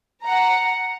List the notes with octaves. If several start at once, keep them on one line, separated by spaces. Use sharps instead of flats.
F#5 A#5